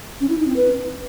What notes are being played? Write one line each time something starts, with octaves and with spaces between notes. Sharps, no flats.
C#4
E4
D#4
C4
B4